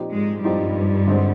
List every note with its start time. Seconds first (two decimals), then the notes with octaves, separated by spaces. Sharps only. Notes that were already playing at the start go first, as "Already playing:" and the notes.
Already playing: A#2 F3 C4 D#4 G4
0.12 G#2 G#3
0.44 G2 A#2 F3 G3 C4 D#4 G4
1.07 D3 G#3 C4